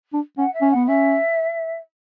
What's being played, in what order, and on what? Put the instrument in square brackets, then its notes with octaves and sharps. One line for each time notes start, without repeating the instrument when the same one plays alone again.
[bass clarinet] D4
[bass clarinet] C#4 [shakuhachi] F#5
[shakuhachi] E5
[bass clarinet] C#4
[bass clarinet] B3 [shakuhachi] F#5
[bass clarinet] C#4 [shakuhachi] E5